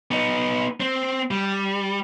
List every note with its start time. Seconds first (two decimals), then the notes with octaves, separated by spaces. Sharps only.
0.11 B3 D#4
0.80 C4
1.31 G3